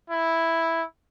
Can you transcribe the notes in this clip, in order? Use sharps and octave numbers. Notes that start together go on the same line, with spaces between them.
E4